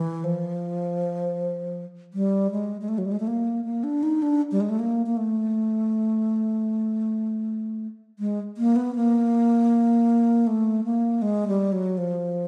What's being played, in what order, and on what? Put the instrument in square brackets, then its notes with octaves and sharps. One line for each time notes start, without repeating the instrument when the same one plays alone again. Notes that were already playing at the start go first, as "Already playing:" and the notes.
Already playing: [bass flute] E3
F3
G3
G#3
G#3
A3
F#3
G3
G#3
A3
A#3
A#3
D4
D#4
D4
G3
G#3
A3
A#3
A#3
A3
G#3
A#3
B3
A#3
A3
A#3
G#3
G3
F#3
F3